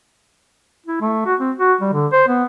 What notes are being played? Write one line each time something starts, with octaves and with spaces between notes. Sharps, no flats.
E4
A3
F#4
C4
F#4
G3
D3
C5
B3